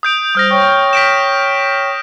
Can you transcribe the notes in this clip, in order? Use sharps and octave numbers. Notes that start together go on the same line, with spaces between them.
D#6 G6 D7
G3 C5 D#6 F6 A#6
C#5 G5 C#6
B6 D7 E7